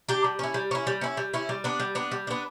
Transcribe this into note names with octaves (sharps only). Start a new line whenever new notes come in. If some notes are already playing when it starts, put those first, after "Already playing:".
D4 G4
G3
C#4 E4
G3
C#4 E4
G3
C#4 E4
G3
C#4 E4
G3
B3 D4
G3
B3 D4
G3
B3 D4